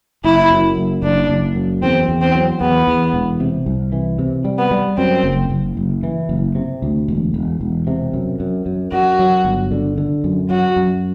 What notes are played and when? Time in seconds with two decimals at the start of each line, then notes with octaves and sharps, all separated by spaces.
0.24 F#1 E4
0.50 F#2
0.77 F#1
1.03 F#1 D4
1.29 F#1
1.55 F#2
1.82 E2 C4
2.08 E2
2.21 C4
2.35 F#3
2.60 E2 B3
2.87 E2
3.14 E1
3.40 C3
3.66 C2
3.92 E3
4.19 C3
4.45 G3
4.58 B3
4.71 G3
4.98 F#2 C4
5.24 F#1
5.50 F#1
5.77 F#1
6.03 E3
6.29 F#1
6.55 C3
6.82 D2
7.08 E1
7.34 E1
7.61 E1
7.87 C3
8.13 F#2
8.40 F#2
8.66 F#2
8.92 F#2 F#4
9.19 F#3
9.45 G1
9.72 D3
9.98 D3
10.24 F#2
10.50 F#3 F#4
10.76 F#2